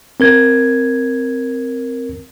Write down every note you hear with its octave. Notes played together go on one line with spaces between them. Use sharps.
C4 A#4 G#6